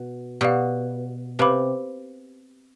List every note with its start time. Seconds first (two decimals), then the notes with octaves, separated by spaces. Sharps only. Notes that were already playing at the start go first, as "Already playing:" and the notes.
Already playing: B2
0.41 B2 G4 D5 F5
1.39 C3 G4 B4 F5 B5 D6